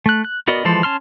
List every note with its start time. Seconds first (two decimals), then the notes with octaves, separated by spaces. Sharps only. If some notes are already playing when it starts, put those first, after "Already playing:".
0.06 A3 F#6
0.25 F#6
0.48 B3 F#4 A#4 D5 D#5
0.65 E3 F3 G#3 A4 C5
0.83 C#4 A5 C6 F6